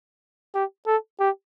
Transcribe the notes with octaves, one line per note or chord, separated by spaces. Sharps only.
G4
A4
G4